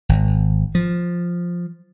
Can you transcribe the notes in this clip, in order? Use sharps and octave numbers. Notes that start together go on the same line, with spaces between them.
G#1
F3